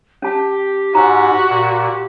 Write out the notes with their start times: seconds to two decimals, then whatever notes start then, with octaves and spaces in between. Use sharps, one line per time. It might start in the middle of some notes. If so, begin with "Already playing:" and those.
0.22 C#4 G4 A5
0.95 G#2 F#4 A#5
1.50 A#2